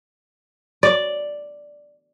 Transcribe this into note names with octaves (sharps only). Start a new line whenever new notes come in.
D5